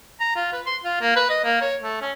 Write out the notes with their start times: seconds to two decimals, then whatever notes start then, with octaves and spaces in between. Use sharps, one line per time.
0.20 A#5
0.36 F4
0.53 B4
0.66 C6
0.84 F4
1.01 A#3
1.16 B4
1.30 D#5
1.44 A#3
1.61 C#5
1.82 A3
2.01 C#4